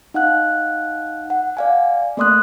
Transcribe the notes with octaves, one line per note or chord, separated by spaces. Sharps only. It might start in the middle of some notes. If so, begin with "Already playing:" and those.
D#4 F5 F#5 F#6
F#5
D5 F5 G#5
A3 A#3 D5 C6 D#6 F#6